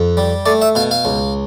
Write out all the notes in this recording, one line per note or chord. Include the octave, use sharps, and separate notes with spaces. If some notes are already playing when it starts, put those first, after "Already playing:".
Already playing: F2
G3
A3 D5
E5
B2 F5
F5
C#2